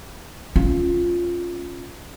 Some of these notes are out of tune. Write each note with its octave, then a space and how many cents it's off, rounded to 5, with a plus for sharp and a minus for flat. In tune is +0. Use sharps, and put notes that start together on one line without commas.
C#4 +0 F4 +0